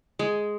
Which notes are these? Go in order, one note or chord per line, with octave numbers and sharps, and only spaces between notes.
G#3